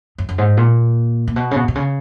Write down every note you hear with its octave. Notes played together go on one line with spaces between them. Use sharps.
F#2
F#2
G#2
A#2
A#2
B2
C#3
B2
B2
C#3